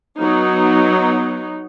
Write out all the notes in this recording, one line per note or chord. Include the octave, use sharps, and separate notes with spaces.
F#3 B3 D#4